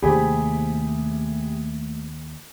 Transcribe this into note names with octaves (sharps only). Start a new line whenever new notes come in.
D#2 C3 A3 C4 G4 G#4 B5